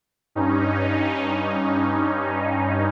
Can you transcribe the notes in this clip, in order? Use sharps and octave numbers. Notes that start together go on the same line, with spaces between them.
G2 C#4 D#4